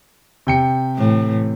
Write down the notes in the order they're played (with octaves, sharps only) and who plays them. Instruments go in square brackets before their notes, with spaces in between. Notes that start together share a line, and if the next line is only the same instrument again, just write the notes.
[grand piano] C3 G5 C#7
[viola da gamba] A2 E3